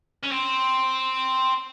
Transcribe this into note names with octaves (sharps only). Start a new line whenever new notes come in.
C#4
C4